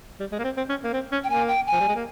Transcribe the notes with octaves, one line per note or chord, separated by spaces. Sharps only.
G3
G#3
A#3
C4
C4
C#4
A#3
C4
C#4
G5
A#3 G#5
G5
G#5
F3
G3
G#3
A#3